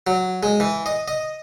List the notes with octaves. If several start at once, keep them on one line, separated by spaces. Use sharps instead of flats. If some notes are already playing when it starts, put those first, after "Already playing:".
F#3
G#3
E3
D#5
D#5